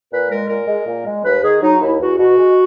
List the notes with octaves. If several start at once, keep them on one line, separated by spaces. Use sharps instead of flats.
A#2 B4
G#3 A#4
A#2 A#4
G#3
A#2
G#3
D#2 B4
D#3 G#4
F#3 D#4
D#2 E4
E2 F#4
B2 F#4
G#3